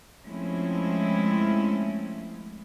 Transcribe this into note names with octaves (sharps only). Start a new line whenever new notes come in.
F3 G#3 A3 C4 C#4 E4